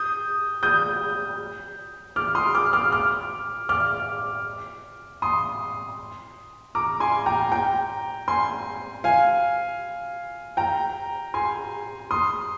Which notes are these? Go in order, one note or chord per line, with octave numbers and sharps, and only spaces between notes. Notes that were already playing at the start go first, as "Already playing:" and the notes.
Already playing: D#6 G6
D#6 G6
D6 F6
C6 D#6
D6 F6
D6 F6
D6 F6
D6 F6
C6 D#6
A#5 D6
G#5 C6
G5 A#5
G5 A#5
G#5 C6
F5 G#5
G5 A#5
G#5 C6
C6 D#6